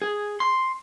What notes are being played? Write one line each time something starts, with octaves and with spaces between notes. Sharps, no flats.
G#4
C6